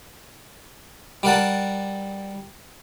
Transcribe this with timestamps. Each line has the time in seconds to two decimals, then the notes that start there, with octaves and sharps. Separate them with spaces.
1.23 G3 A#4 F#5 A5